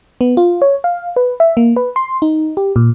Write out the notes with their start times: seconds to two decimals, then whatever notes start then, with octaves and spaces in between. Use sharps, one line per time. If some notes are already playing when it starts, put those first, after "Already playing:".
0.21 B3
0.37 F4
0.62 C#5
0.84 F5
1.16 B4
1.40 E5
1.57 A#3
1.76 B4
1.96 C6
2.22 D#4
2.57 G4
2.76 A#2